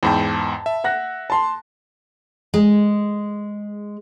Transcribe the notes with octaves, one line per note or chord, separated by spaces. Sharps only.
E2 G#2 G5 A5 B5
E5
F#5 F#6 A#6
A5 C6
G#3